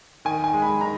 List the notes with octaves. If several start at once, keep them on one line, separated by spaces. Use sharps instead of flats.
D#3 G#5
G#5
G#3
B5
D#3 A#5